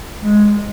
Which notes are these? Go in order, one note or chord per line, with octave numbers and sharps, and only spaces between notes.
G#3